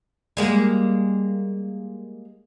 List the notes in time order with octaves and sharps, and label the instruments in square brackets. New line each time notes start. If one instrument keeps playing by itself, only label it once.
[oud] G3 G#3 A#3